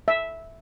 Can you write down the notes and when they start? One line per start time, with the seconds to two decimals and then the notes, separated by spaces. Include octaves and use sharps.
0.08 E5